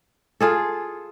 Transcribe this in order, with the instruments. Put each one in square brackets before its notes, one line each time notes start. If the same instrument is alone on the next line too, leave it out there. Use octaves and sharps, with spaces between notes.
[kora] F4 G#4 A4